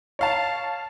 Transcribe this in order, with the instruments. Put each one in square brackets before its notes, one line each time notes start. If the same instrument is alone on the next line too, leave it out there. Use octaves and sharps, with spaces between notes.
[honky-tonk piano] C#5 F5 A5